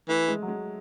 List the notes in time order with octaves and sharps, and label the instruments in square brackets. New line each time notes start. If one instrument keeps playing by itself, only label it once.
[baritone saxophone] E3 [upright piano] A3
[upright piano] G#3
F#3
G#3